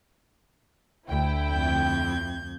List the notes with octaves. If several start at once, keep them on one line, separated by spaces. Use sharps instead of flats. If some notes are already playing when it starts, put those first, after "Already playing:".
D2 E4 G5
F2 G6 G#6